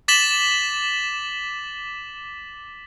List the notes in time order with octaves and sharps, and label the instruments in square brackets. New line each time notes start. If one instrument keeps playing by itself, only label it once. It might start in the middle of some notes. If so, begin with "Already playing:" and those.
[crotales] D6 A6 B6 E7 F#7 G7